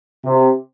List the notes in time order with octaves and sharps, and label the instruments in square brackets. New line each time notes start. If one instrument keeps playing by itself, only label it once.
[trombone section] C3